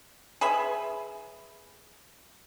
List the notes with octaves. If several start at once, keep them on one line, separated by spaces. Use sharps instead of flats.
G#4 B4 E5 B5